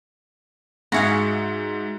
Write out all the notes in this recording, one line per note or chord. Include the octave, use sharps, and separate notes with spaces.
G#2 F#4 G#4 E5 F5 C#7